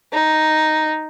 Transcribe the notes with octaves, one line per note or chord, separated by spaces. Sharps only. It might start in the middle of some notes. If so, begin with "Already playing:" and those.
D#4